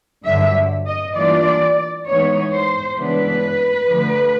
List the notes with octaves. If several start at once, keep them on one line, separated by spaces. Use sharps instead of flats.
G2 D3 F#3 E5
D#5
E3 G3 A#3 D4 F4 D5
E3 G#3 B3 D#4 C#5
C5
C#3 E3 G#3 B3 D4 B4
D3 F3 A3